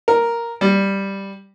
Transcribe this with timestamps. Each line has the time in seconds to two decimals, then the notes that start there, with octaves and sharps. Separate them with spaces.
0.08 A#4
0.61 G3